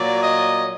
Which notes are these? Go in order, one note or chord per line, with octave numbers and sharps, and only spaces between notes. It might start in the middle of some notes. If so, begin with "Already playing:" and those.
Already playing: A#2 F#3 D5
D#5